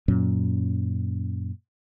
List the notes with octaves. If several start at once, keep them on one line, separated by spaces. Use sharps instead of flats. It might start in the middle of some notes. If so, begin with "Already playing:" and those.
F#2 A#2 F#3 C#4